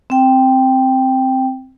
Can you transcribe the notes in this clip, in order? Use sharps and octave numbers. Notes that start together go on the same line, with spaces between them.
C4 G5